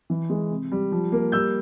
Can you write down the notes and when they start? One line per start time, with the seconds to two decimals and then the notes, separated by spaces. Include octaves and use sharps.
0.10 E3
0.30 G#3
0.50 C3
0.72 G3
0.92 F3
1.12 A#3
1.32 G3 E6 G6